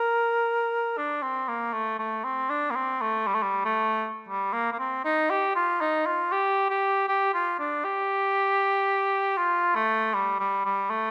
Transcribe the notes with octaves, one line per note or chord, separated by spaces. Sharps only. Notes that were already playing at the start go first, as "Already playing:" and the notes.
Already playing: A#4
D4
C4
A#3
A3
A3
C4
D4
A#3
C4
A3
G3
A3
G3
A3
G3
A#3
A#3
C4
D#4
G4
F4
D#4
F4
G4
G4
G4
F4
D4
G4
F4
A3
G3
G3
G3
A3